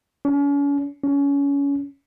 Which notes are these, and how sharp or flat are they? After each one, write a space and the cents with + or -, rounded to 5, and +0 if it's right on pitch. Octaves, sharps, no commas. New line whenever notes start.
C#4 +40
C#4 +25